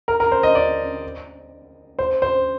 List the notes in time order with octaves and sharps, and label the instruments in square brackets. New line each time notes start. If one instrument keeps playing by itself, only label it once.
[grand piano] A#4
A#4
C5
D#5
D5
C5
C5